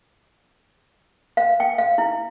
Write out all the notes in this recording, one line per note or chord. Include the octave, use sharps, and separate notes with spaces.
F5
G5
F5
E4